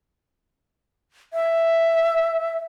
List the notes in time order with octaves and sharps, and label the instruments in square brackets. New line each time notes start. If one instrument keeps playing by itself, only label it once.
[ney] E5